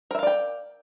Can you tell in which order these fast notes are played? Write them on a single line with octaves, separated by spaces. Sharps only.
A#4 E5 F5 D5 G5